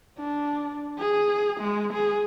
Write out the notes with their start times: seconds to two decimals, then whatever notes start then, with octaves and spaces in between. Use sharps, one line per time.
0.18 D4
0.98 G#4
1.60 G#3
1.93 G#4